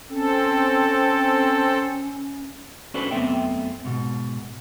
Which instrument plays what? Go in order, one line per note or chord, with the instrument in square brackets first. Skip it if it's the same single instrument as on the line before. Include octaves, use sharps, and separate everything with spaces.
[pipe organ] C4 A4 [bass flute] C#4
[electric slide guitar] C#4 D4 F#4 A4 B4 C5
F#2 A3 B3 C4 E5 G5
G#2 B2